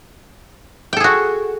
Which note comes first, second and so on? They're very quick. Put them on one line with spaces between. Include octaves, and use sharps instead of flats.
G5 A4 G#4 F#4